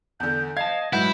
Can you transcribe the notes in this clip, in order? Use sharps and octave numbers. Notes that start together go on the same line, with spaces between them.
E2 D3 G6
D#5 F5 A5 G#6
G#2 F#3 E4 B4 F#5 G6